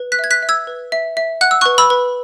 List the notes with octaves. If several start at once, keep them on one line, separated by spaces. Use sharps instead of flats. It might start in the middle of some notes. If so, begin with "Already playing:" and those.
Already playing: B4
F#6 B6
E5 G#6
F#6 B6
E5
E6 G#6
B4
E5
E5
F#5 F#6
E6
C#6 F#6
B4
B5 E6
B4